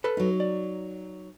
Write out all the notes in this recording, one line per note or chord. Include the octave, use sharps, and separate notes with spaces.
A4 B4 B5
F#3 D#4
D5